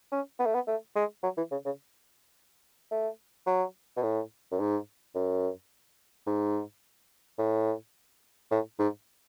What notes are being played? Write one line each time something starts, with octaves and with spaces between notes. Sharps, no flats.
C#4
B3
A3
B3
A3
G#3
F#3
E3
C#3
C#3
A3
F#3
B2
A2
F#2
G#2
F#2
G#2
A2
A2
G#2